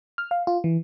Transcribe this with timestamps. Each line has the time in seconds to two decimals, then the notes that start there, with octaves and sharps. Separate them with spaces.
0.18 F6
0.31 F5
0.47 F4
0.64 E3